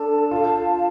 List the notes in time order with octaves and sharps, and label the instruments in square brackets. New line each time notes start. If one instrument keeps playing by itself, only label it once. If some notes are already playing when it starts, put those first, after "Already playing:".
Already playing: [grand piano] D4 [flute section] A4 A5
[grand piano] F4 [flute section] F5
[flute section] F5